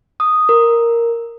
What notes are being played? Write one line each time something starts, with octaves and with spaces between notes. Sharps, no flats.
D#6
A#4